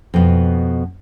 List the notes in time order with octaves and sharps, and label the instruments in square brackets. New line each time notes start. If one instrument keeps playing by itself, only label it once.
[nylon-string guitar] F2 B2